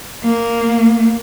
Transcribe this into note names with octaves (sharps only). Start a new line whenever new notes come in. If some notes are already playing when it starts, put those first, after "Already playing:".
A#3